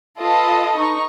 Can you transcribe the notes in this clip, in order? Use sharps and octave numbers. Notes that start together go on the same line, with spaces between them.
F4 A4 B4 D#5 A5
D#4 C#6